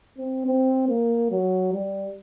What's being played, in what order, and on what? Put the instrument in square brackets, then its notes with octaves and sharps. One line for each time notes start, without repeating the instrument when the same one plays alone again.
[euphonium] C4
C4
A#3
F#3
G3